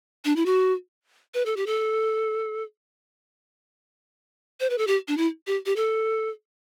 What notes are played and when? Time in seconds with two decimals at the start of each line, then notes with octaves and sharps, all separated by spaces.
0.25 D4
0.36 E4
0.46 F#4
1.34 B4
1.46 A4
1.57 G4
1.66 A4
4.60 C5
4.70 B4
4.78 A4
4.87 G4
5.08 D4
5.17 E4
5.47 G4
5.66 G4
5.76 A4